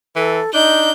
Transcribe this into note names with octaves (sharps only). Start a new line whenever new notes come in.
E3 A4
D4 D#4 G6